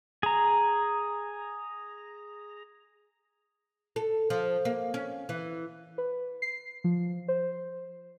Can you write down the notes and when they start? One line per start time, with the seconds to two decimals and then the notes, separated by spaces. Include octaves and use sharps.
0.23 G#4 A#5
3.96 A4
4.30 F3
4.65 A#3
4.94 C#4
5.29 E3
5.98 B4
6.42 C7
6.84 F3
7.28 C5